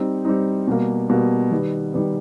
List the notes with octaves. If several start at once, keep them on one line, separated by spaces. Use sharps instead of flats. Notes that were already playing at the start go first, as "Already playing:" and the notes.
Already playing: G3 C4 D#4
G3 C4 D#4
B2 G3 A#3
B2 G3 A#3
D#3 G3 B3
D#3 G3 B3